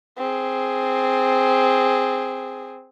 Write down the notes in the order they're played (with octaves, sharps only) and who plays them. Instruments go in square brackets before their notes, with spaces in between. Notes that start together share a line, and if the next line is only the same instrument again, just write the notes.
[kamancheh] C4 G#4